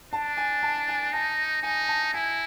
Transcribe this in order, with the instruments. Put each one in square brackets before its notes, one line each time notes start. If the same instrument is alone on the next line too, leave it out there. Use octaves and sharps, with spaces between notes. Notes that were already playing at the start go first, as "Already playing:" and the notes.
[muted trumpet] D4 [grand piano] A5
[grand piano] G#5
A5
G#5
[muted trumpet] D#4 [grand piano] A5
[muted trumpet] D#4 [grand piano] G#5
[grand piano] A5
[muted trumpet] E4 [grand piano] G#5